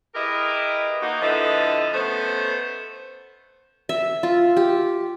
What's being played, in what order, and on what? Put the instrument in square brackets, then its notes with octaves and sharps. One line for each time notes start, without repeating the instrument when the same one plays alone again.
[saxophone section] E4 G4 G#4 A#4 B4 D#5
A#3 D#4 F#4
D3 F3 E4 A4 B4 D#5
A3 B3 C#4 C5
[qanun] E5
F4
G4